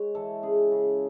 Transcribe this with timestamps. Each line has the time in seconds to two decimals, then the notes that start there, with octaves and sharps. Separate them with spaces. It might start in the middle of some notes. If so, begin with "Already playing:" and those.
Already playing: G#3 C#5
0.15 E3 A4
0.43 C#3 G#4
0.72 C#3